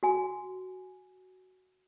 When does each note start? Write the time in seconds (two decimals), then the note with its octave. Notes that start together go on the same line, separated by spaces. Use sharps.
0.03 F#4 G#5